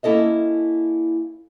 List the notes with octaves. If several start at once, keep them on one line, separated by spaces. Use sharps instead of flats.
A#3 C#4 E4 A4 D#5 E5